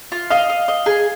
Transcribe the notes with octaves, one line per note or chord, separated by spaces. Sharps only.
F4
D#5 F5
D#5
D#5
G#4